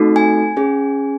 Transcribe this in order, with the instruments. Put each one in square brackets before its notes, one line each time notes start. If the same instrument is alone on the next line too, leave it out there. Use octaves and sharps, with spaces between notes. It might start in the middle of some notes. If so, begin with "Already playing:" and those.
Already playing: [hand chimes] A3 C4 D#4 F#4 A4
G#5
C#4 G#4